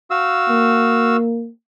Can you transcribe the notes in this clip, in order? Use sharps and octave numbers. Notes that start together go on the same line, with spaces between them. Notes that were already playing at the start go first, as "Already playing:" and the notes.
F#4 F5 E6
A#3